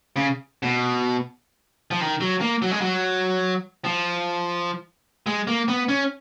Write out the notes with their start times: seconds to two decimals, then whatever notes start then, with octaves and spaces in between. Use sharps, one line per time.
0.16 C#3
0.63 B2
1.91 F3
2.01 D#3
2.21 F#3
2.41 A#3
2.62 F#3
2.71 G#3
2.81 F#3
3.85 F3
5.26 G#3
5.47 A#3
5.68 B3
5.89 C#4